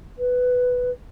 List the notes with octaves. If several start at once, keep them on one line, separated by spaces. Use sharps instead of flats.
B4